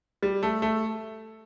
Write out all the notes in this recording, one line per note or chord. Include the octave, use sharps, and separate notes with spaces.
G3
A3
A3